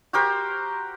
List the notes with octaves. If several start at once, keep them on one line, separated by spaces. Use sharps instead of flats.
F#4 G4 A#4 C5